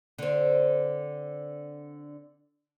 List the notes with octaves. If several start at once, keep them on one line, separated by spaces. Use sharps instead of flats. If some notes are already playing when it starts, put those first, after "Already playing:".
D3 C4